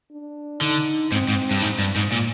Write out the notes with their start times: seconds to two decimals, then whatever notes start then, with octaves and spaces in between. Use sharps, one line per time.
0.11 D4
0.61 D3 D#4
1.11 G#2 C4
1.28 G#2
1.51 G2
1.62 G#2
1.79 G2
1.96 G#2
2.12 A#2